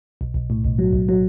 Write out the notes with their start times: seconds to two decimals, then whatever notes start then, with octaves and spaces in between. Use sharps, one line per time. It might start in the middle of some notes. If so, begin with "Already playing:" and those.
0.21 B1
0.34 B1
0.50 A2
0.64 B1
0.79 F#3
0.93 B1
1.09 F#3